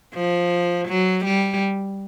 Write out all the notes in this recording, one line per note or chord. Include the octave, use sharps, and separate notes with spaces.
F3
F#3
G3